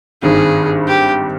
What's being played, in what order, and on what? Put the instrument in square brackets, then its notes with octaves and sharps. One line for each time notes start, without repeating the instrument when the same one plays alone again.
[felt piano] G#1 G2 D#3 [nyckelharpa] G#4
[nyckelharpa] G4